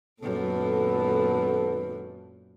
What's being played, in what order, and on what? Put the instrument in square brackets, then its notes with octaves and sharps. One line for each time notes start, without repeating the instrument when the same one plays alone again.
[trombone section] G#1 B3 A4 [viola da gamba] F#2 A#2